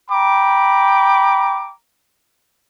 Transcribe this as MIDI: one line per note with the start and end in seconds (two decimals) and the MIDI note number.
0.11 1.72 79
0.11 1.72 82
0.11 1.72 83
0.11 1.72 86